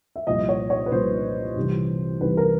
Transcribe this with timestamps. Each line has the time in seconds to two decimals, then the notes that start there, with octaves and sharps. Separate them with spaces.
0.16 E5
0.27 C2 A#2 F3 D#5
0.49 C#5
0.70 C#5
0.86 B4
0.92 C2 A#2 F3 C5
1.57 C2 C3 E3
2.21 C2 C3 E3 B4
2.37 A#4